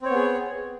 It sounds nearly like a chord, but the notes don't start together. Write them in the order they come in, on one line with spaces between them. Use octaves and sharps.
C4 C#5 B3 G#4